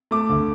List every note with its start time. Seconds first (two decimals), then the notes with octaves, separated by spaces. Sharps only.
0.11 A3 D6
0.29 D2